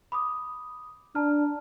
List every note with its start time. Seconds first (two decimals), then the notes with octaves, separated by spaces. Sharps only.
0.12 B5 D6 D#6
1.15 D4 A5 A#5 F6